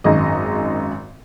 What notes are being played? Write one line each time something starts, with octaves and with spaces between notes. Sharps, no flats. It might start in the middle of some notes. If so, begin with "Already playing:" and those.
G#1 F#2 D#3 G#3 D#5